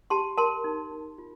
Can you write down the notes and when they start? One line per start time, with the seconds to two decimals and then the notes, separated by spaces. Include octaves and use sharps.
0.10 G4 A5 C6
0.38 A#4 A5 C6
0.64 D#4
0.91 D#4
1.18 F4